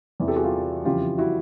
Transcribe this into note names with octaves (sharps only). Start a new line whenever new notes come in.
E2 C3 E3
G4 A4
F#4 G#4
F4 G4
F2 C#3 E3 F4 G4
E4 F#4